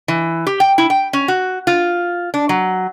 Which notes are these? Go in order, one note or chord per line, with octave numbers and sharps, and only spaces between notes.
E3
G4
G5
E4
G5
C#4
F#4
F4
D4
F#3